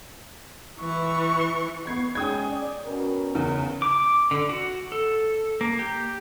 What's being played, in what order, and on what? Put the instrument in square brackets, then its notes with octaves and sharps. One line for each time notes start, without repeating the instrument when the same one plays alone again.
[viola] E3 C#6
[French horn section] B3 [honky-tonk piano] C#6 G#6 C7
[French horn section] G#3 C#4 G#4 [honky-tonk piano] G5 D#6 G#6
[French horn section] D5
B2 C#4 A#4
[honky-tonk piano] E2 C#3
[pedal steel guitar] D6
D3
F#4
A4
A#3
G4